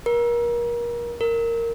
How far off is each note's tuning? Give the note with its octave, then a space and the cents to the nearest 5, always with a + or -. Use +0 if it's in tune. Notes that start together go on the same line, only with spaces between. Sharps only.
A#4 +30
A#4 -10